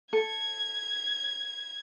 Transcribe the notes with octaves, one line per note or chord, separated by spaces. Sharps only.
A4 G#6